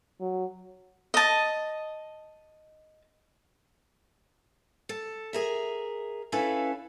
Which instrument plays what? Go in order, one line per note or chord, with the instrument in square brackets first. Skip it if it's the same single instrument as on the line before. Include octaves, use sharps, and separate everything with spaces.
[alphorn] F#3
[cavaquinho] D#5 A5
[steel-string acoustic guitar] A4
G#4 A#4 E5
C#4 E4 A4 B4 F5